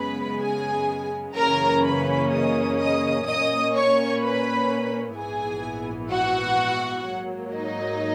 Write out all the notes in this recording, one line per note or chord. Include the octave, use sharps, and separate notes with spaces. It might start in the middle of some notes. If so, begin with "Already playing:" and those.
Already playing: F#2 C#3 G#3 B3 B4 B5
G#4 G#5
F#2 C#3 E3 A#3 C#4 A#4 A#5
B4 B5
D#5 D#6
D#5 D#6
A#2 A#3 C#4 D#5 D#6
C#5 C#6
B4 B5
A#1 G#2 E3 B3 G#4 G#5
F#4 F#5
G#2 F#3 A#3
D#4 D#5